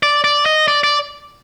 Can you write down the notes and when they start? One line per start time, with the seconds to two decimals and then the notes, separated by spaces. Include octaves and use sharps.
0.03 D5
0.24 D5
0.46 D#5
0.68 D5
0.84 D5